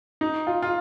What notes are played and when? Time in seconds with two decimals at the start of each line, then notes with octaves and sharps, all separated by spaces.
0.21 D#4
0.47 F4
0.62 F4